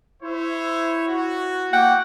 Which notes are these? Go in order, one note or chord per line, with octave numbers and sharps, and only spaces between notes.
E4 C5 C#5 E5
F#4
A#3 F#5 G5